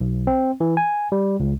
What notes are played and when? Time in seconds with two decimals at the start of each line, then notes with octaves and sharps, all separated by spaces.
0.01 B1
0.27 C4
0.60 E3
0.77 G#5
1.12 G3
1.40 C#2